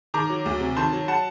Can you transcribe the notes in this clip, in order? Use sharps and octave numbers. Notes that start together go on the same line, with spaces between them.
D#3 A#5 D6
F#3
D2
C3
D#3 A5 C6
F#3
F#5 A5